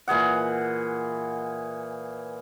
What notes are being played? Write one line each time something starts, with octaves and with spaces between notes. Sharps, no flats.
A#2 E3 G#4 F#5